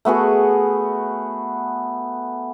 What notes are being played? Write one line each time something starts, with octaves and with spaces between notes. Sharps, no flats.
A3 B3 F#4 G#4